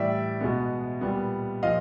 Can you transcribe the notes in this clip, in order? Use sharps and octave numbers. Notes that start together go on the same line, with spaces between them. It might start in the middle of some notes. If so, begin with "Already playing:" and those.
Already playing: A2 E3 G3 D5 E5
B2 G#3 B3
A#2 G3 B3
A#2 F3 D#5 F5